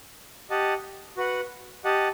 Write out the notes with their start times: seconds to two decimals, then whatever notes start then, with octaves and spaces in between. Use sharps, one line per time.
0.50 G4 D#5 F#5 A5
1.17 F#4 B4 F#5
1.84 G4 D#5 F#5 A5